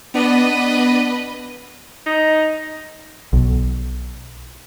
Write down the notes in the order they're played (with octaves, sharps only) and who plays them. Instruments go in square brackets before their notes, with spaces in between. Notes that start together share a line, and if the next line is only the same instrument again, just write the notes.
[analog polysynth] B3 D4 [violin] B4 D#5
[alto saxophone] D#4
[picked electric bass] B1